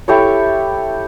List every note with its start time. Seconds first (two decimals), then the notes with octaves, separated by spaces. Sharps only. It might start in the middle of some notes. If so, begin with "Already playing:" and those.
0.08 E4 G4 A4 C#5